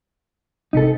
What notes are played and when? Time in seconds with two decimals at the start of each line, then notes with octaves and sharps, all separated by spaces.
0.73 G#1 C3 D#4 A4